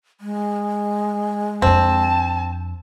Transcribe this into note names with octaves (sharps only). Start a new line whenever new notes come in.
G#3
F2 C4 D4 A5